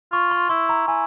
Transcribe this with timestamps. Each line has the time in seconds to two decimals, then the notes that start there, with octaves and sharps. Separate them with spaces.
0.12 F4 C#6
0.31 C6
0.49 E4 C6
0.69 A#5
0.88 E4 G#5